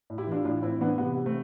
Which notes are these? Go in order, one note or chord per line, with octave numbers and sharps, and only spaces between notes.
A2
E4 G4
E3 D4 F4
A2 D4 F4
A2 C4 E4
E3 B3 D4
C3 B3
C3
A3 C4